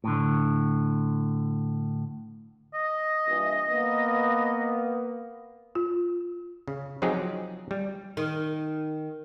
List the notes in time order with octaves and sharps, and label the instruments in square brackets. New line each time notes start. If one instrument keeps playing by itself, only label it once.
[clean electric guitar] A2 D3
[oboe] D#5
[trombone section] G2 A#2 E3
A#3 B3
[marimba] F4
[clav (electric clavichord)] C#3
F3 F#3 C4 D#4 G4 G#4
G3
[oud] D#3